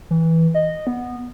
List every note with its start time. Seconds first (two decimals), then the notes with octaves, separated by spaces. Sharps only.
0.11 E3
0.55 D#5
0.87 B3